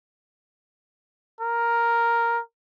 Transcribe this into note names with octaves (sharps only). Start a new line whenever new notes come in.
A#4